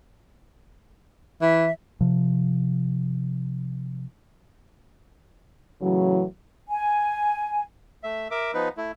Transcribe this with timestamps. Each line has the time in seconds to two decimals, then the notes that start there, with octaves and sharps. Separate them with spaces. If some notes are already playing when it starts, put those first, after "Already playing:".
1.41 E3 E5
2.01 C3 F3
5.82 A2 C#3 E3 F#3
6.68 G#5
8.03 A3 E5
8.31 A#4 E5 D6
8.54 F3 B3 D#4 B4
8.77 A3 E4